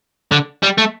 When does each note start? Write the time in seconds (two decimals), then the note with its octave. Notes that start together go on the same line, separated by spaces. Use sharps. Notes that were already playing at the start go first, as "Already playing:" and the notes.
0.32 D3
0.63 G3
0.78 A3